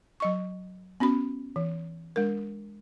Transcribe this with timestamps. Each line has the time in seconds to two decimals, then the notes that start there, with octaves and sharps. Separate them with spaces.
0.20 F#3 D#5 C#6
1.00 B3 C#4 F#4 B5
1.56 E3
2.16 G#3 D4 A#4